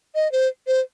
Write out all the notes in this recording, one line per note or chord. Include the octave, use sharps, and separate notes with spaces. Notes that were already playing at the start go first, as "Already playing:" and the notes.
D#5
C5
C5